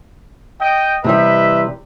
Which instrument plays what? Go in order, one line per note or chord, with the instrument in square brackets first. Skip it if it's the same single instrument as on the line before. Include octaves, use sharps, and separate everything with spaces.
[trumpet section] D#5 G5
[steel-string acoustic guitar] C3 E3 G3 [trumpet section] B4 D#5 E5